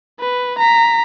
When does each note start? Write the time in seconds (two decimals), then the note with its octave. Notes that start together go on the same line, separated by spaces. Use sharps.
0.20 B4
0.58 A#5 B6